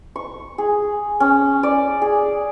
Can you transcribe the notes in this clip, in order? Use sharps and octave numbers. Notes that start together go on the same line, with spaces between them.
C#6
G#4
C#4
D5
G#4